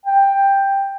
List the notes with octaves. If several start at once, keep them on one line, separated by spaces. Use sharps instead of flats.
G5